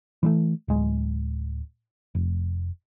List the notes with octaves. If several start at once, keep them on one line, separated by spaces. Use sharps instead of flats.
E3 G3 A3
D1 G#3
F1